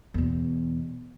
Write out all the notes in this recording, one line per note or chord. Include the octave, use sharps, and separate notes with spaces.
E2 B2